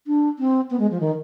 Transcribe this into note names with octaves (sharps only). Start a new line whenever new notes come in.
D4
C4
B3
G#3
F3
D#3